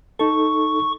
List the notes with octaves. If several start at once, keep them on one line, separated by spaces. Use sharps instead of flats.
D#4 A4 C#6